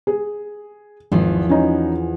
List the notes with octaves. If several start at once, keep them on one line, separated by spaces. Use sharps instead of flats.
G#4
G#1 E2 F3
C#4 D#4